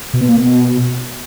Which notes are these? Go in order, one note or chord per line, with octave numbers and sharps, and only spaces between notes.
B2
B3
A#3
B2